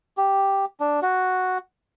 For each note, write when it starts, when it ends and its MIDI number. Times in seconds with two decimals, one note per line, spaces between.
0.17 0.65 67
0.80 1.00 62
1.02 1.58 66